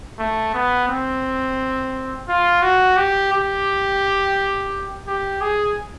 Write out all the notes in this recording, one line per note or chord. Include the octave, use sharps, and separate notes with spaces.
A3
B3
C4
F4
F#4
G4
G4
G4
G#4